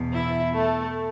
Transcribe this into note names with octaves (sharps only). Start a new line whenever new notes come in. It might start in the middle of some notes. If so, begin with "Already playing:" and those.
Already playing: E2 B2
E4 E5
A3 A4